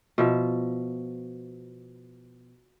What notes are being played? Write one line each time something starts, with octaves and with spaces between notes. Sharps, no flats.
B2 F3 E5